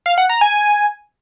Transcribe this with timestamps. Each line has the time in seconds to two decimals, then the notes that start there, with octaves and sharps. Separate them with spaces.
0.06 F5
0.18 F#5
0.29 A#5
0.41 G#5